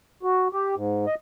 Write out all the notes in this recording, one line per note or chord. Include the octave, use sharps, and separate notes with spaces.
F#4
G4
G#2
D#5